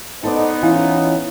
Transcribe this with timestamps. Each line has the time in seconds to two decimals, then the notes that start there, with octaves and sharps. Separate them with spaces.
0.24 B3 D#4 A4 C5 D5
0.63 E3 C#4 F4